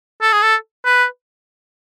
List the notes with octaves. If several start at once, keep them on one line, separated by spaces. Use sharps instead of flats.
A4
G#4
A4
B4